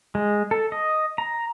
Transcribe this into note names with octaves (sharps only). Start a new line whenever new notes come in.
G#3
A4
D#5
A#5